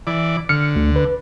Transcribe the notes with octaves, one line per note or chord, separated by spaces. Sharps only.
E3 D5
D3 F6 C#7
D2
B4